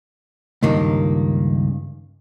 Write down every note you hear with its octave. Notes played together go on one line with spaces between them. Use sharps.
C#2 G2 D#3 A#3